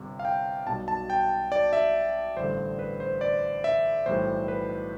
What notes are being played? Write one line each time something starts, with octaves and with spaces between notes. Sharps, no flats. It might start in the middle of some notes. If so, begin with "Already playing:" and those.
Already playing: G1 C3 G3
F5
G5
B1 B2 G3 A5
A5
G5
D5
E5
A1 G2 D3 G3 C5
B4
C5
D5
E5
B1 A2 E3 G3 C5
B4